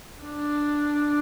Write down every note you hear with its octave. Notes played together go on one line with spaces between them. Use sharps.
D4